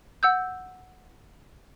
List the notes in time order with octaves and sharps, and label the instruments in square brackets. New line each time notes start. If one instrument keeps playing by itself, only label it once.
[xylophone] F#5 E6 G6